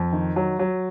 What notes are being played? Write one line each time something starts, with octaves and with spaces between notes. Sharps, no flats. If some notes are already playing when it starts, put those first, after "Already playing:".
Already playing: F2
D#3
F#3
F#3